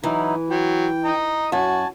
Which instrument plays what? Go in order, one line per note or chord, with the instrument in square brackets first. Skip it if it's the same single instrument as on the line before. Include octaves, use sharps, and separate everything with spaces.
[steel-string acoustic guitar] E3 [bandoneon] F#3 D#4 E4
[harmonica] F#3 [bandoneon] G5
[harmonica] D#5 A#5
[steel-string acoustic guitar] F#2 [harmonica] F#4 [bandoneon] G#5 A5